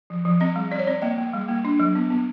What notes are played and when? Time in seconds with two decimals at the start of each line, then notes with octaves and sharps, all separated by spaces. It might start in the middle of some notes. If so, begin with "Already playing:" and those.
0.10 F3
0.25 F3
0.40 C4 D#5
0.56 G3
0.71 C4 D5
0.79 C#5
0.87 C4 D5
1.02 A#3 D#5
1.18 A#3
1.33 G3
1.49 A#3
1.65 D4
1.80 F#3
1.95 B3
2.10 B3